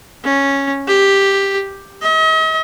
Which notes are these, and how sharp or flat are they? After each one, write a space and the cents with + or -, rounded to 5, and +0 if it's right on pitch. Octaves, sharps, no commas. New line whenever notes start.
C#4 -5
G4 +5
D#5 +45